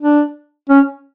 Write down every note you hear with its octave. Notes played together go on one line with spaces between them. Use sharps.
D4
C#4